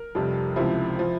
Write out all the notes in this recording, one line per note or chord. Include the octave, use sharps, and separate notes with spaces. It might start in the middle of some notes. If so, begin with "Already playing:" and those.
Already playing: A#4
F1 F2 C3 G3
C#2 C3 F3 E4
F3